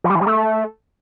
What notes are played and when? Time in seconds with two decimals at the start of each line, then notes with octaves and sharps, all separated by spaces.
0.04 F3
0.10 G3
0.15 E3
0.21 G3
0.27 A3